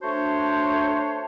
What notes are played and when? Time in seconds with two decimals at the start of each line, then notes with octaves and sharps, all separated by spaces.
0.02 A3 D4 F#4 C5 C#5 A5